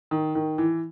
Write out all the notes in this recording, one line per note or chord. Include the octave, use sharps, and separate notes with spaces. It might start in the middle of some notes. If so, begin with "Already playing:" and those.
D#3
D#3
E3